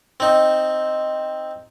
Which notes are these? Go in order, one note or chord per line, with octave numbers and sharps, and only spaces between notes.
C4 D#4